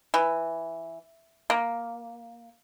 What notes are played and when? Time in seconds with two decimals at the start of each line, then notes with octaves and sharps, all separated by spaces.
0.14 E3
1.50 A#3